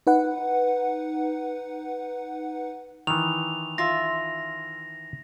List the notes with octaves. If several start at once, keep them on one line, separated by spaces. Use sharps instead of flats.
D#4 B4 F#5
D#3 E3 F7
F4 E5 A#6